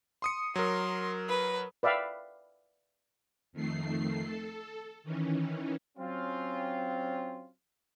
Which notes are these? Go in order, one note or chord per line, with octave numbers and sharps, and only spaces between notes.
C6 D#6 C#7
F#3 A#4 C6
B4
B4 D5 E5 F5 G5 B5
F2 D#3 A3 C7
A4
D#3 E3 C#4
F#3 C4 C#4 F4